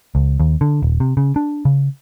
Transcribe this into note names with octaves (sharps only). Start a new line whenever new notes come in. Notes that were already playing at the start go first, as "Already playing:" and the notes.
C#2
D#2
D3
D#1
C3
C#3
D4
C#3